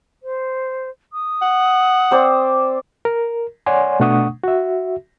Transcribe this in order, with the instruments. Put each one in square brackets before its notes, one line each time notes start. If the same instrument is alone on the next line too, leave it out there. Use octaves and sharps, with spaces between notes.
[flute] C5
D#6
[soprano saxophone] F#5
[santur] C4 C5 D5
[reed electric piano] A#4
C#5 D5 F#5 G#5 C6
B2 A3 D4 F#5 C#6 D#6
F#4 E5